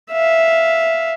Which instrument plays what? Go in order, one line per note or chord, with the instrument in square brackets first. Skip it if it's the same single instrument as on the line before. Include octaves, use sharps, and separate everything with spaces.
[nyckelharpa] E5 F5